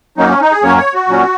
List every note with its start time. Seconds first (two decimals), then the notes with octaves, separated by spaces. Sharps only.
0.17 F#2 F#3 A#3 C#4 D#4
0.29 C#4
0.41 D#4
0.52 G#4
0.63 F#2 F#3 A#3 C#4 C#5
0.78 C#5
0.94 F#4
1.08 A#2 F#3 C#4